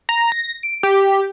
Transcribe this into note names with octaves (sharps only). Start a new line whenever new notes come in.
A#5
A#6
D7
G4